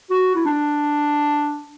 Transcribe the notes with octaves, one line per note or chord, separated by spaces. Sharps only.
F#4
E4
D4